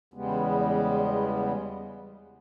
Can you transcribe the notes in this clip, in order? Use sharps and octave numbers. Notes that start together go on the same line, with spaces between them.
E2 C#3 G3 G#3 B3